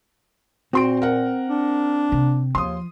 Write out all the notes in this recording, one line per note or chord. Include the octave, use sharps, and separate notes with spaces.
A#2 C4 F#4 C6 D7
A#4 F#5
D4
C3
D#2 F3 C6 D#6